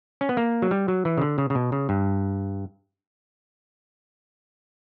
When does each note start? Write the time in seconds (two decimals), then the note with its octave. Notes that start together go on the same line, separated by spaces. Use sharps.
0.21 C#4
0.29 B3
0.37 A#3
0.62 F#3
0.71 G3
0.88 F#3
1.05 E3
1.18 C#3
1.22 D3
1.38 C#3
1.50 C#3
1.55 B2
1.72 C#3
1.89 G2